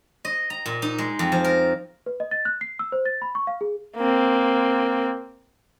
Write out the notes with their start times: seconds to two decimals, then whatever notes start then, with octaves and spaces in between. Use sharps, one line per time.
0.25 D#5
0.50 A#5
0.66 A#2
0.82 D#4
0.98 G#3
1.19 F2
1.32 F3
1.45 A#4
2.06 B4
2.20 D#5
2.31 A6
2.45 F#6
2.61 C7
2.79 E6
2.92 C5
3.06 A6
3.22 B5
3.35 C#6
3.47 F5
3.61 G#4
3.97 A#3 C4